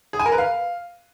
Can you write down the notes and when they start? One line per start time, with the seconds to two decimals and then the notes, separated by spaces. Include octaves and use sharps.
0.13 G#4
0.19 G#5
0.26 A#4
0.32 B4
0.38 F5